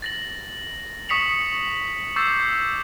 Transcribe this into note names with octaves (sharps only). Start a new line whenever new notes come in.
A6 A#6 F#7
C#6 D#6 B6 C#7 F7 F#7
C#6 D6 E6 G6 A6 C7